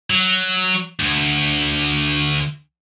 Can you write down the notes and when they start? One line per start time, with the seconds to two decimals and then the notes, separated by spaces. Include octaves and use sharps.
0.10 F#3
1.00 D2